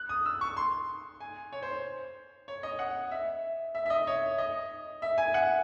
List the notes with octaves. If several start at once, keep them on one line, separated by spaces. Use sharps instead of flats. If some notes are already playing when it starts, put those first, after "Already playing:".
Already playing: F#6
D#6
E6
C#6
C6
G#5
C#5
C5
C#5
D#5
F#5
E5
E5
E5
D#5
C#5
D#5
E5
G#5
F#5